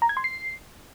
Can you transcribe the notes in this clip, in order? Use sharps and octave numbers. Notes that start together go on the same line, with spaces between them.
A#5
G#6
C6
C7